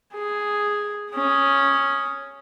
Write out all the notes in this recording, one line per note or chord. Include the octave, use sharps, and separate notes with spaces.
G#4
C#4 D#6